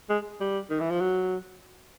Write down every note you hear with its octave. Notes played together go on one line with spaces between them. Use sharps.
G#3
G3
D#3
E3
F3
F#3